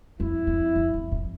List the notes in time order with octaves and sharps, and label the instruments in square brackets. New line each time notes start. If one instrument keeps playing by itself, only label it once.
[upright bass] F2 [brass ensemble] E4
[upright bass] F2
F2
F2
F2